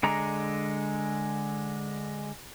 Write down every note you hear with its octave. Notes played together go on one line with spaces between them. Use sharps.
D3 G#3 A#5